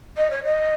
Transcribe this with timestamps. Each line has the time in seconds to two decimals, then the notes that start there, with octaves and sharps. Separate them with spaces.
0.17 D#5
0.31 C#5
0.44 D#5